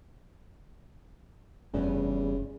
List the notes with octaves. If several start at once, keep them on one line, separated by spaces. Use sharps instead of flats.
F1 E2 G2 C#3